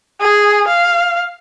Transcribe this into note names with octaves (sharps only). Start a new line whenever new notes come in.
G#4
F5